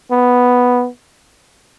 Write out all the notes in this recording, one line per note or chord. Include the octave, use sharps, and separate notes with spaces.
B3